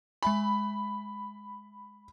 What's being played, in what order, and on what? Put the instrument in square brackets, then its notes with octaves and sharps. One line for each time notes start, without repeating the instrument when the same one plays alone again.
[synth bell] G#3 E5 G#5 [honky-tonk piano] B5